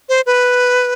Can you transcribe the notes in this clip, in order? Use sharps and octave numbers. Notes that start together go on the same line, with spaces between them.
C5
B4